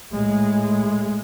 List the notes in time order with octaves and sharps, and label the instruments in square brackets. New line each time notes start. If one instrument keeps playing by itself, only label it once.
[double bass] A2 G#3